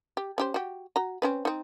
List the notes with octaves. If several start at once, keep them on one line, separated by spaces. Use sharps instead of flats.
G4
C#4 G4 C5
F#4 G4
F#4 A#5
C4 C#4 B4
C4 D#4